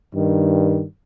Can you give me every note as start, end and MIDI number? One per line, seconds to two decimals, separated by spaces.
0.15 0.84 43
0.15 0.84 51